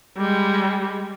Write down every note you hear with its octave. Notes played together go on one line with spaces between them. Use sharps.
G3 G#3